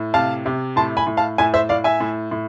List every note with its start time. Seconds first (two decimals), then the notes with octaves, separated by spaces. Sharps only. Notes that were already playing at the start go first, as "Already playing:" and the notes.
Already playing: A2
0.14 C3 F5 A5
0.46 C3
0.76 A2 A5 C6
0.97 G#5 B5
1.07 A2
1.17 F5 A5
1.38 A2 E5 G#5
1.54 C5 E5
1.69 A2 D5 F5
1.84 E5 G#5
2.00 A2
2.31 A2